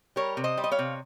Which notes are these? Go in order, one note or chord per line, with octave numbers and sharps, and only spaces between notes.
G3 A#4 C#5
C3
C5 D#5
G3
D#5
C#5 F5
C3